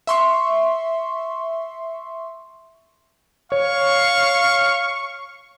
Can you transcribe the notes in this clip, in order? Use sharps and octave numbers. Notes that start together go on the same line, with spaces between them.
E5 C6 C#6
C#5 F5 C#6